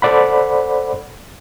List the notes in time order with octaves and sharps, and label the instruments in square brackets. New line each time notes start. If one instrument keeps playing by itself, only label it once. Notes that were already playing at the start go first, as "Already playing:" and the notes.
[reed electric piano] A4 C5 D5 F#5 B5